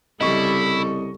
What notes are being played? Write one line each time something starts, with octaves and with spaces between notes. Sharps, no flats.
C2 C#3 G3 E4 A4 D#5 C#6